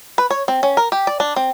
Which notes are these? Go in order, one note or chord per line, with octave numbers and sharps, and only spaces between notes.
B4
C#5
C4
C#4
A#4
G4
D5
D4
C4